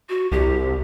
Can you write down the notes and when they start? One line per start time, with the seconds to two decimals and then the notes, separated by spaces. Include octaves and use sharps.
0.09 F#4
0.32 C2 G4